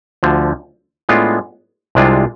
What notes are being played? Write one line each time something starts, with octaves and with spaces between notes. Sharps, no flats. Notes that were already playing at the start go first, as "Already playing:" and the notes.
D2 D3 F3
A2 G#3 B3 D4 F4
C2 C3 G#3 D4 F4